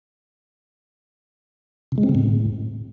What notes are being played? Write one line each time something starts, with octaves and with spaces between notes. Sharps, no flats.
C3
G#3
C4
C#3
A2